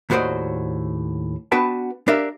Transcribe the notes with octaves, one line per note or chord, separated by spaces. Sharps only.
D#2 A2 F#4 C5 D5 D#5
B3 D4 F#4 B4 G5 A5
D4 G4 A#4 D5 E5 F5